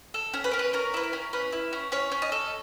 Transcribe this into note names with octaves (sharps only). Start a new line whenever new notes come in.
A4
C#4
B4
C#4 A#4
B4
C#4 A#4
E4 B4
A#4
C#4
C#4 B4
E4
C#4
C#4 C#5
C#4
D#5
A4